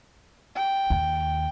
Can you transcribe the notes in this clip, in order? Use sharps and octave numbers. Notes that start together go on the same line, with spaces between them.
G5
D#2